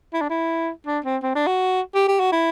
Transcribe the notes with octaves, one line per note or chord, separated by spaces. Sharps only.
E4
D4
E4
D4
C4
C4
D4
F#4
G4
G4
F#4
E4